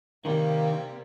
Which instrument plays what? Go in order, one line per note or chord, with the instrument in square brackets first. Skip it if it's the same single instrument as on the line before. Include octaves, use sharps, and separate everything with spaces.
[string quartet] C3 G3 A#3 [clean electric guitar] D#3 [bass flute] F5